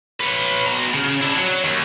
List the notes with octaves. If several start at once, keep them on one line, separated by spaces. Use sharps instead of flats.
B4 C#5
B2 A#5
C#3
D4 E4
F#3
D#2